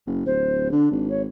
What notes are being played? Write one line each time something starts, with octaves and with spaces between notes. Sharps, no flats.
F#1
D1 C5
D3 D4
G#1
C#5